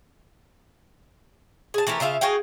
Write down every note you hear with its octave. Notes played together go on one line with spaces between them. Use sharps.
G#4 A5
E3 A3 G4 A#4
C#3 F4 E5 F5
F#4 G#4 F5 G5